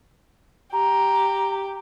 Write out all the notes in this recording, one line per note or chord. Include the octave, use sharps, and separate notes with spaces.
G4 A#5